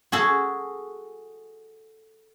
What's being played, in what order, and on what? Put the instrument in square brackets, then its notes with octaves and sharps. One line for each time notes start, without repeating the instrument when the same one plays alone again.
[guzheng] F#4 G#4 A4